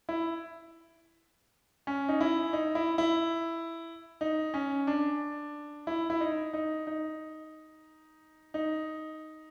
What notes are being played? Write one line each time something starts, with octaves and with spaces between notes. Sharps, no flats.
E4
C#4
D#4
E4
D#4
E4
E4
D#4
C#4
D4
E4
E4
D#4
D#4
D#4
D#4